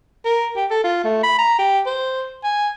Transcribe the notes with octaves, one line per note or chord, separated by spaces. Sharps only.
A#4
G4
A4
F4
A3
B5
A#5
G4
C5
G#5